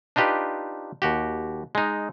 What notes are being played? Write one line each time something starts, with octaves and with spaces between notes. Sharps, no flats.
D4 D#4 F4 G4 B4
D#2 F#4 G4
G#3 D#4